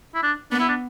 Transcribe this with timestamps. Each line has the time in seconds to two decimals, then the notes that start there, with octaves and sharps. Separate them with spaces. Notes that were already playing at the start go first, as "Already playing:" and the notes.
0.15 E4
0.23 D4
0.51 B3 D4
0.60 E4
0.69 D4